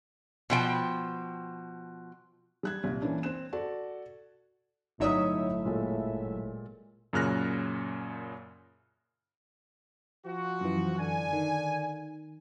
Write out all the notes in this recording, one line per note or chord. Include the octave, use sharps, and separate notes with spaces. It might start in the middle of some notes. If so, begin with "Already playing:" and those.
B2 F3 G5
G3 F#6 G#6
C2 A#2
E3 A#3 C#4 D4
C4 F#6 E7
F#4 A4 D5
G1 A2 F#3 D#4 C#5 E5 D#6
A#2 G#3 A4
F#2 A#2 C#3 F6 F#6 A#6
F3 F#4
F#2 E3
D3 D4 G#5
D#3